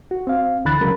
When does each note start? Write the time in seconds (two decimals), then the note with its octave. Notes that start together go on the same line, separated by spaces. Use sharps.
0.11 F#4
0.27 C4 F5
0.65 D2 D3 E3 B5 F#6 A6
0.81 C#3 F#3 G#3 C#4 A#4 B5